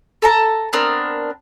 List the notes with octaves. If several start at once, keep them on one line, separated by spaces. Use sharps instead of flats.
A4 A5 A#5
B3 C4 D4 A#4